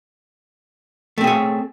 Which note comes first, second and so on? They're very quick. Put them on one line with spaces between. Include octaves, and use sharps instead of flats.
A3 C4 G#4 C#5